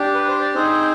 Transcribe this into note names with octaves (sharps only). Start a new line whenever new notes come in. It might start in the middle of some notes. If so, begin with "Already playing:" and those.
Already playing: D4 G4
B4
C5
D5
C4 D#4 G#4 C5